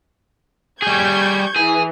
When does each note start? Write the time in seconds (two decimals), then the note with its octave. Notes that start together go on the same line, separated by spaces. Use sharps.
0.82 G3 G#4 C#6 G6 G#6
1.56 E3 G#4